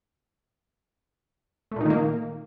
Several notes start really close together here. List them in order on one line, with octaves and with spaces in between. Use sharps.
A3 A#2 D#4 D#3 A#3